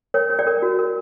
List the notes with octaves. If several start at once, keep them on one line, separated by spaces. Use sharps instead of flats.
A#4 C#5
C#5
D5
A#4
F#4
A#4